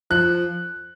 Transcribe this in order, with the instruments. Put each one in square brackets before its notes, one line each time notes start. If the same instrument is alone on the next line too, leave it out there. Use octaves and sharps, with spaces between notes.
[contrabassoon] F3 [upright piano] F#6